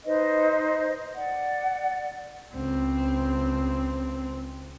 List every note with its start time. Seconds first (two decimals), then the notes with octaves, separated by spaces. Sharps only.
0.06 D#4 B4 C5 D#5
1.16 D5 F#5
2.54 C#2 C4